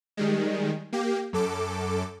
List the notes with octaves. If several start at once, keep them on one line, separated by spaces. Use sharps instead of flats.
D#3 G3 G#3
A#3 G4
F#2 A4 D6